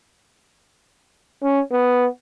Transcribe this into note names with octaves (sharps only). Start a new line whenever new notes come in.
C#4
B3